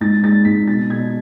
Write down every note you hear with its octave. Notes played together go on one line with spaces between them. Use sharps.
G#2 A6
G#2 A6
G#2 B6
B2 A6
B2 G#6